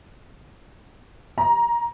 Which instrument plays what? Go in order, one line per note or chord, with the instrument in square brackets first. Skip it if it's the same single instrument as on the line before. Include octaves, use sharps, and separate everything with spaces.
[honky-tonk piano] A#5